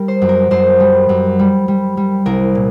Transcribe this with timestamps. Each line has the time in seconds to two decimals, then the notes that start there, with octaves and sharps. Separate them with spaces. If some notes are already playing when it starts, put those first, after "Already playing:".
Already playing: G3 A#4
0.08 C5
0.22 F#2
0.29 A#4
0.51 F#2 C5
0.80 G3
1.09 F#2
1.39 G3
1.68 G3
1.97 G3
2.26 C2 A#4
2.55 A#2